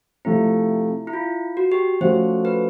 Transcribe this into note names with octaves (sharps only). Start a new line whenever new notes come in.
C3 F3 A3 C4 E4
E4
F4
F#4
G4
F3 A3 C#4 F#4 A4 C5
B4